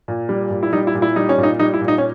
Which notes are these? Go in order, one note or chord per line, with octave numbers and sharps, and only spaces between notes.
A#2
G3
A#2
E4
G3 D#4
E4
A#2
E4
G3 D#4
C#4
A#2
D#4
G3 D#4
E4
A#2
D#4
C#4